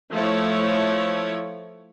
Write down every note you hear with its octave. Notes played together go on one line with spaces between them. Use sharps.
F3 A3 E4 C#5